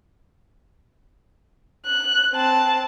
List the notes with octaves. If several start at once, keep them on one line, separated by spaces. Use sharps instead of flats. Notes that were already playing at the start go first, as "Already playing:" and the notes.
F#6
C4 A5